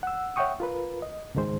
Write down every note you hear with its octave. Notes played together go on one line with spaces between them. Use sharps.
F#5 E6
C#5 E5 F#5 G5 C#6 D#6
F4 A#4 B4
D#5
C#2 G#2 D#3 G#3 C5